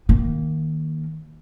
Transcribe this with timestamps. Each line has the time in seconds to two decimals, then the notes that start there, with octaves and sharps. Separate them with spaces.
0.09 D#3 A#3